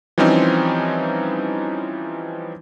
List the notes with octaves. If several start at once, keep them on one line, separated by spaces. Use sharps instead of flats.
E3 F3 G3 C4 C#4 D#4